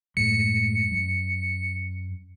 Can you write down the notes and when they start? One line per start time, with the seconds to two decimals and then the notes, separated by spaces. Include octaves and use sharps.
0.17 F#2 A2 G#3 C#7
0.91 F#2